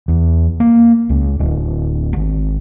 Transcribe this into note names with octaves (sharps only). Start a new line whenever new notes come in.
E2
A#3
C#2
D1
G#1